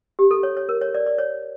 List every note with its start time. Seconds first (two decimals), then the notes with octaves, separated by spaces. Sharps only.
0.19 G4
0.31 A4
0.43 C#5
0.57 C#5
0.69 A#4
0.81 C#5
0.95 D5
1.06 D5
1.18 C#5